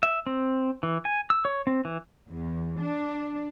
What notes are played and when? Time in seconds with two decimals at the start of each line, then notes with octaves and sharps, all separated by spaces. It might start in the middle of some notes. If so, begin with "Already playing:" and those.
0.03 E5
0.27 C4
0.83 E3
1.05 G#5
1.30 E6
1.45 C#5
1.67 C4
1.85 E3
2.29 E2
2.78 D4